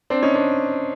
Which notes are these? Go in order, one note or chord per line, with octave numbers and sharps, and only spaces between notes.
C4 D4
C#4 D#4
C4 D4